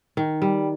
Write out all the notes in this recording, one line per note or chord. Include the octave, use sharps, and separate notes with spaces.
D#3
G3